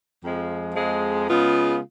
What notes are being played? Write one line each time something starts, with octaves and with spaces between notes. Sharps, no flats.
F2 F3 G#3
F2 F3 G#3
C#3 G#3 B3 F4